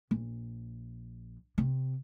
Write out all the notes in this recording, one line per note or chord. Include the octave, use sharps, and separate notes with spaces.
A#1
C3